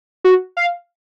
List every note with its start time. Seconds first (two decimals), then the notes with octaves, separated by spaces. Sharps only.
0.24 F#4
0.57 F5